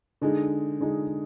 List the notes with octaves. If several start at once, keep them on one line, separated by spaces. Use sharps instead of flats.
D3 G#3 D#4
D3 G#3 D#4